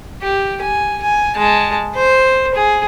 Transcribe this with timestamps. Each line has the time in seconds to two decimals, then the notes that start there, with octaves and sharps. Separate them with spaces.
0.22 G4
0.61 G#5
1.02 G#5
1.36 G#3 A5
1.95 C5
2.55 G#4